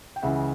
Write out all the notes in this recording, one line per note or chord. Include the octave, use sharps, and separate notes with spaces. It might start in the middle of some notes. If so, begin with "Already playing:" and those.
G5
C#2 C#3 E3 E5 F#5